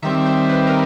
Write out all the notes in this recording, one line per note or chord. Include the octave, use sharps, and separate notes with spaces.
D#3 G3 C4 E5
C5
B4
A#4